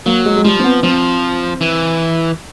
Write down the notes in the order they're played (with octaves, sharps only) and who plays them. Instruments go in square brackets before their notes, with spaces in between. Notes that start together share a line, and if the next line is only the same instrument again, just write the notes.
[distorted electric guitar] F#3 [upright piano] A#3
[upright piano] G#3
G#3
[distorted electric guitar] F3 [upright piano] G3
[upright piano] C4
B3
[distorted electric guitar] F3 [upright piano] C4
[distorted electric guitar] E3